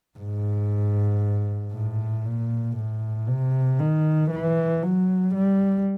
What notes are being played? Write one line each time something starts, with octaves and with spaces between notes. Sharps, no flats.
G#2
A2
A#2
A2
C3
D#3
E3
F#3
G3